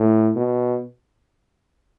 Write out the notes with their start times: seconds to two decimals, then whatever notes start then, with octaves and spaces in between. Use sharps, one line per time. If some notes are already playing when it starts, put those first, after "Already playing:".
Already playing: A2
0.36 B2